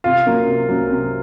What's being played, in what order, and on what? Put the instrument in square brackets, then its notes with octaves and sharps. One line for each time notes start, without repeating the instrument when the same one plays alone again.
[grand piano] C3 [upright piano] F4
[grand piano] F#3 A#3 C#4
C3
F#3 A#3 C#4
C3